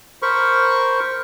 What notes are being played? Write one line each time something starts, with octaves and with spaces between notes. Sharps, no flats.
A#4 C5 B5 C#6